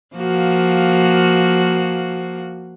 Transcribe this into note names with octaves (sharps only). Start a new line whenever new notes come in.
F3 A#3 F#4